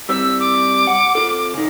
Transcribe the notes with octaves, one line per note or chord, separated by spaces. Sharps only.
G3 C4 E6
D6
F#5
F4 A4
C#3 D#4